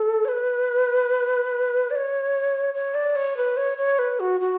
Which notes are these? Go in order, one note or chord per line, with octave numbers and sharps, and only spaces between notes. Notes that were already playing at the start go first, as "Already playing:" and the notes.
Already playing: A4
C#5
B4
D5
C#5
C#5
D5
C#5
B4
C#5
C#5
B4
F#4
F#4